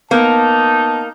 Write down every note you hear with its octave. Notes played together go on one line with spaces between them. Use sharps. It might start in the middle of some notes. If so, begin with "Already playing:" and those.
A#3 B3 D#4 A5